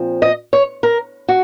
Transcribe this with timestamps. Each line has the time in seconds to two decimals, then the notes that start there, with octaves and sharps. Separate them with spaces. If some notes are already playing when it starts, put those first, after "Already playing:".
Already playing: A#2 F3 C4
0.22 D#5
0.53 C#5
0.83 A#4
1.28 F#4